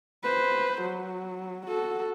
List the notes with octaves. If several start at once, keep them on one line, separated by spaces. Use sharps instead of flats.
B4 C5
F#3
F#4 A4